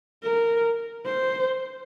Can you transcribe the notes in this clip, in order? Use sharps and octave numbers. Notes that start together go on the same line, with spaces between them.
A#4
C5